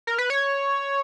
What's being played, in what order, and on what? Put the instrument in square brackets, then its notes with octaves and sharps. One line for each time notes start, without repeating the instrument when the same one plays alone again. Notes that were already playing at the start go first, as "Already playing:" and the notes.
[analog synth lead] A#4
B4
C#5